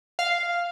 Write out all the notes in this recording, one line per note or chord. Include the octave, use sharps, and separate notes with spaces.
F5